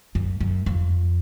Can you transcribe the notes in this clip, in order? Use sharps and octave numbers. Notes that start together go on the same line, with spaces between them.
F#2
F#2
F2